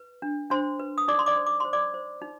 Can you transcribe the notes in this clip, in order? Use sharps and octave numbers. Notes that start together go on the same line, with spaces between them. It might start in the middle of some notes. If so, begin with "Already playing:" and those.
Already playing: B4
D4
D4 C5 C6
B4
D#6
D#4 D5 D6
C6
D5 D6
C5
D6
C5 C6
D5 D6
C5
D#4